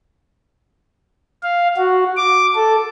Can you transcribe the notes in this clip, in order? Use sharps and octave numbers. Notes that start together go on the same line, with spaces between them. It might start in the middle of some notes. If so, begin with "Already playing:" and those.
F5
F#4
D6
A4